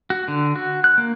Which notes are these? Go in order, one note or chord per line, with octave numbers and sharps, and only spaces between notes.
F#4
D3
F#4
F#6
A#3